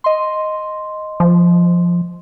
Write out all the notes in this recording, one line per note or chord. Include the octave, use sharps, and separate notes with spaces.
D#5 C6
F3